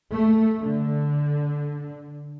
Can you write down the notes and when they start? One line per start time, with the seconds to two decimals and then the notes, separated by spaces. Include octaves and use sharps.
0.11 A3
0.61 D3